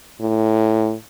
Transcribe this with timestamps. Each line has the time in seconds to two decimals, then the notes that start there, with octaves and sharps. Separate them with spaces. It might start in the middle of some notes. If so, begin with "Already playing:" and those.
0.21 A2